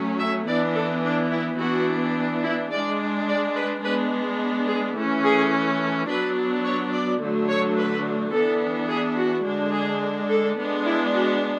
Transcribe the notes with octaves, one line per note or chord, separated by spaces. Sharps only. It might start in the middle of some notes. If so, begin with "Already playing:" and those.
Already playing: F#3 A3 C#4
E5
E3 B3 D4 D5
A4
D4
E4
E3 B3 D4 F#4
E4
G#3 D4 D5
D5
B4
G#3 B3 D4 B4
G#4
E3 A3 C#4
G#4
A4
F#3 B3 D4 B4
C#5
D5
D3 F#3 A3 D4
C#5
B4
E3 B3 D4 A4
G#4
F#4
D3 G#3 D4
G#4
A4
G#3 B3 D4
E4
F#4